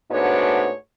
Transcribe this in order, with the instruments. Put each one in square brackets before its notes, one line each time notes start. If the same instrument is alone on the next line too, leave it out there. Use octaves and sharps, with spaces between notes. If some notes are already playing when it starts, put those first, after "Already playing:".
[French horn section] G#2 A3 B3 D4 F#4 C#5